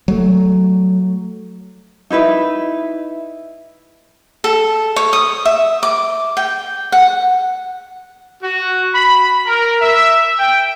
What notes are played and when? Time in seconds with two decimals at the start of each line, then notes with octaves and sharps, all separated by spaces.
0.08 F#3 A3
2.10 D#4 E4 B4 E5
4.44 A4
4.96 C#5
5.13 D#6
5.45 E5
5.83 D6
6.37 G5
6.92 F#5
8.43 F#4
8.94 B5
9.47 A#4
9.81 E5
10.39 G5